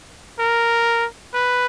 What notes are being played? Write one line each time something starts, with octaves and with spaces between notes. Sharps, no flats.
A#4
B4